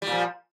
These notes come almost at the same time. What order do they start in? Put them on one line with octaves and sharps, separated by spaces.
G3 A#2 F3